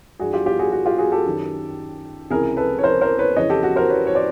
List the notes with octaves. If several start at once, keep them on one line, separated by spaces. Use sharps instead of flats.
G2 E3 F#4 G#4
F4 G4
F4 G4
F#4 G#4
F#4
F4 G4
F#4 G#4
G4 A4
F#2 D#3
C#2 C3 E3 G#4 A#4
A4 B4
C#5
A#4 C5
A#4 C5
B4 C#5
F2 C#3 E3 C#5 D#5
G4 A4
F#4
A#4 C5
B4 C#5
C#5
C5 D5